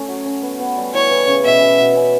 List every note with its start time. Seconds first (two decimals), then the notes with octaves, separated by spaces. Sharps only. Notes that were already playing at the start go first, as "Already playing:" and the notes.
Already playing: A3 C#4
0.08 F#3
0.26 C#4
0.43 B3
0.59 B3
0.77 G3
0.94 E3 C#5
1.11 E3
1.27 C#3
1.45 B2 E5
1.61 B2
1.79 B2
1.96 C#4